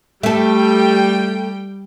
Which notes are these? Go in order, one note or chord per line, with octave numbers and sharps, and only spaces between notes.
G3 A3 A4 G5